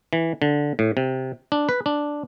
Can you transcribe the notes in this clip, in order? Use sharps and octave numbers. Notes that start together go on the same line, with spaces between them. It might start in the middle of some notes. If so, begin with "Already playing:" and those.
E3
D3
A2
C3
D4
B4
D4